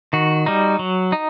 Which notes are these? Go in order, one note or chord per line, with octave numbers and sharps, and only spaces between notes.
D#3 F#4
G3 D#4
F#3
D#4